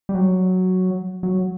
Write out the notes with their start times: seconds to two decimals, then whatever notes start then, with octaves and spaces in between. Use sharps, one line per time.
0.09 G3
0.15 F#3
1.23 F#3